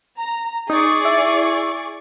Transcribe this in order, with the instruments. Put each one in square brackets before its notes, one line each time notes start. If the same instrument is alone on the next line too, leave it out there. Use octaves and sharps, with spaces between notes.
[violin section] A#5
[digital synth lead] D#4 [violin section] G#4 D5 C#6
[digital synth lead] E4